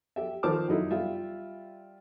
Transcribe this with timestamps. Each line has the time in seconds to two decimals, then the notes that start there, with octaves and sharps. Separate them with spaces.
0.16 G4 E5
0.43 D#3 F3 C5 A5 D6 F6
0.68 F#2 D#4 E4
0.91 G3 F4 E5